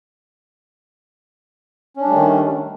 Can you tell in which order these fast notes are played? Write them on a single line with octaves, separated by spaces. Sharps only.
C#4 D4 G3 A3 D#3